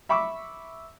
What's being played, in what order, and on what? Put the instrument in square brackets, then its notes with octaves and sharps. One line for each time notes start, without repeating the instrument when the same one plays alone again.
[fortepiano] E5 B5 C#6 D6 E6